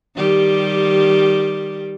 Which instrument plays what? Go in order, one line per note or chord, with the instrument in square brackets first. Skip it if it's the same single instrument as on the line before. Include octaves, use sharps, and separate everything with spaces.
[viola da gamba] D#3 G3 G4